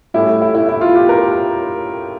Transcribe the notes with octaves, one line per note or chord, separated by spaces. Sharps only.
A2 G3 C#4 E4
E4
E4
E4
F4
G4
A#4